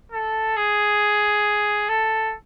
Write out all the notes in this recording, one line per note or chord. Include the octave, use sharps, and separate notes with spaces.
A4
G#4
A4